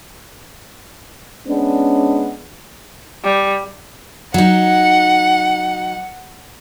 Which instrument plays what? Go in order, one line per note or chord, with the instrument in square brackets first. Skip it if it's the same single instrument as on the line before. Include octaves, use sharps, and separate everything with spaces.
[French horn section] G#3 B3 C#4 D4
[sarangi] G3
[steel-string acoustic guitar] F#3 D#4 [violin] F#5